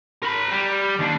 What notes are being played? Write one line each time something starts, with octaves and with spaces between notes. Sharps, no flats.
A#4 B5
G3
D#2 D4